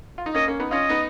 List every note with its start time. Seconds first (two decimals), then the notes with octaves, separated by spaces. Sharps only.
0.18 F4
0.26 D#4
0.35 A#3 C#4 D#5
0.48 A#3 C#4
0.60 B3 D#4
0.71 C#4 F4 D#5
0.89 B3 D#4